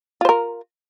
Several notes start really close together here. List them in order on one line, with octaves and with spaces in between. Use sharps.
F4 C5 A#4